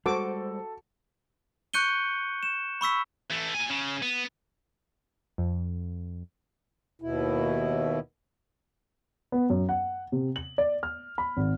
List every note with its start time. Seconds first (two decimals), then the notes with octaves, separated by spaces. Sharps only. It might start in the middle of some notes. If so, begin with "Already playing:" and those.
0.06 G3 G#3 F#4 A4 C5 D6
1.74 C#6 F#6 G6 C#7 D#7 G7
2.43 E7
2.81 B5 C#6 E6 B6
3.31 E3 A3
3.55 A#2 G#5
3.70 C#3
4.02 B3
5.38 F2
7.02 D#2 B2 E4
9.32 B3
9.50 F#2
9.69 F#5
10.12 C3
10.36 F#7
10.58 D5
10.83 F6
11.18 B5
11.37 G#1